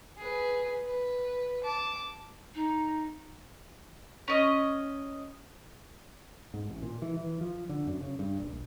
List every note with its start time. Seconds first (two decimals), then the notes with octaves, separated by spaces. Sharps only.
0.17 G#4 B4
0.85 B4
1.64 A5 D6
2.54 D#4
4.28 C#4 D#5
6.54 G#2
6.70 A1
6.82 A#2
7.02 E3
7.17 E3
7.41 F3
7.69 D3
7.87 F#2
8.01 C#3
8.19 G2
8.40 D#1
8.53 A#1